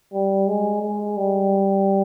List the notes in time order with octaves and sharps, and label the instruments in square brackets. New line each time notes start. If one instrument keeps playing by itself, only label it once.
[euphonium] G3
G#3
G#3
G3